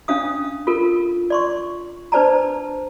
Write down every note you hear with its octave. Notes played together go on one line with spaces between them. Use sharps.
C#4 D4 F5 D#6
F4 A4 A#4
D5 C6 C#6
D4 B4 C5 D5 A5 A#5